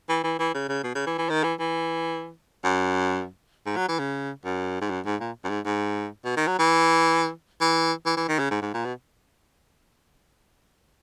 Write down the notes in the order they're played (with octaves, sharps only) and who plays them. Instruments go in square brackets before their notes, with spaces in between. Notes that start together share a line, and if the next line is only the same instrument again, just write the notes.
[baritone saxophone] E3
E3
E3
C#3
C#3
B2
C#3
E3
E3
D#3
E3
E3
F#2
G#2
F#3
E3
C#3
F#2
G#2
F#2
G#2
A#2
F#2
G#2
G#2
B2
D#3
F#3
E3
E3
E3
E3
D#3
C#3
G#2
G#2
A#2
B2